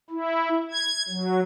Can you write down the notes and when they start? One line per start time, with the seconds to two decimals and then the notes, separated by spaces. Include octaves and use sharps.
0.10 E4
0.71 G#6
1.08 F#3